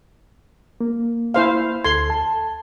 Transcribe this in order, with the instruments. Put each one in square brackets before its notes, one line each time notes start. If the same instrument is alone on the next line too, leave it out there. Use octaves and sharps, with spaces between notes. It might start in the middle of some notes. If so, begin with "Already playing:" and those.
[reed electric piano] A#3
[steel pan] E4 C5 F5
[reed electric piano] D2 A4 G#6 [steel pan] C6
[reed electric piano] A5